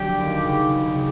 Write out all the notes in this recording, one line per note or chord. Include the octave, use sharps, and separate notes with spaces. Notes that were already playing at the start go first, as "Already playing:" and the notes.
Already playing: D3 F#3 G4
D#2
C#3
C#3
C#3